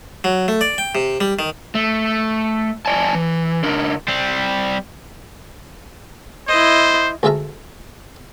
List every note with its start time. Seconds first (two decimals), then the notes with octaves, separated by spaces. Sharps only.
0.24 F#3
0.48 A3
0.61 D5
0.78 G5
0.95 C3
1.21 G3
1.39 D#3
1.75 A3
2.86 F2 D5 G#5 A5
3.14 E3
3.63 C#3 D4 A#4
4.08 G3 C4
6.48 E4 C5 D#5
7.23 D2 G#3 F4 E5 A5 A#5